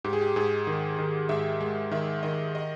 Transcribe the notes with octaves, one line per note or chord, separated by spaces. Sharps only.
G#2 G4
G#4
G4
G#2 G#4
D#3
D#3
G#2 E5
G#3
D#3 E5
D#3 D#5
D#5